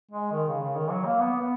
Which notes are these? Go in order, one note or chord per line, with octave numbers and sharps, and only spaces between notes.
G#3
D#3
C#3
C#3
D#3
F#3
A#3
B3
B3